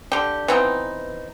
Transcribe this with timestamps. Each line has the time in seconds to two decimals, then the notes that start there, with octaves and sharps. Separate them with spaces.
0.12 D3 G4
0.48 E3 B3 C4 D#4